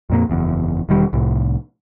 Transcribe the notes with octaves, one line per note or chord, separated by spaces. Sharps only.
F2 A#2 A#3
F#1 E2
E1 D#3 G3
C2 A2